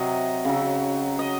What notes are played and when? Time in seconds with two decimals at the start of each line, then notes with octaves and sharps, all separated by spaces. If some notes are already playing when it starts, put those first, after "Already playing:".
Already playing: C3 F#3 D#5
0.45 C#3 F#3
1.19 D#5